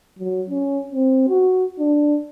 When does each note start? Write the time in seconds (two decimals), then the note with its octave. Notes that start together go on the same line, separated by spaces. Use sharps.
0.19 F#3
0.50 C#4
0.92 C4
1.29 F#4
1.79 D4